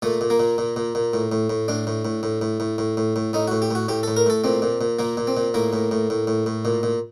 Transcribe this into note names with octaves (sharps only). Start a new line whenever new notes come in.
A#2 A3
A#2
A#3
A#2
A#2
A#2
A#2
A2
A2
A2
A2 D4
A2
A2
A2
A2
A2
A2
A2
A2
A2 D#4
A2 F#4
G4
A2 F#4
A2 G4
A2 A4
A#4
A2 A4
A#2 C4
A#2
A#2
A#2 A#3
A#2
C4
A#2
A2 A#3
A2
A2
A2
A2
A2
A#2
A#2